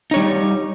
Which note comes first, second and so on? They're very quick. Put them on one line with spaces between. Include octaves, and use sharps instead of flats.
D#4 C#5 G3